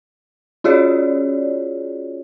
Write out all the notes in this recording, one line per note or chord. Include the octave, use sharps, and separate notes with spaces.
C#4 F4 F#4 G#4 C#5 D5